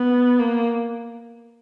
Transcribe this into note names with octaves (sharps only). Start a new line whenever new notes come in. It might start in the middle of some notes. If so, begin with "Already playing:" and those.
Already playing: B3
A#3